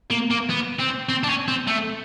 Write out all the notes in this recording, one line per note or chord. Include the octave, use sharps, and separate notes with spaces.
A#3
A#3
B3
C4
C4
D4
C#4
C4
A3